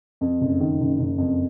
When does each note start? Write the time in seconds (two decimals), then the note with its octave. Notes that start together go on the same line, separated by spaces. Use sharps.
0.21 F2
0.41 F#1
0.60 D#3
0.80 F#1
0.99 F#1
1.18 F2